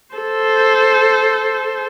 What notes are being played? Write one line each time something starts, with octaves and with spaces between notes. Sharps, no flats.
A4 C5